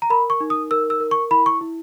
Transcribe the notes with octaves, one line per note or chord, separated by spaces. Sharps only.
A#5
A#4 B5
C#6
D#4
D#6
A#4 E6
E6
A#4
C#6
E4 B5
C#6
E4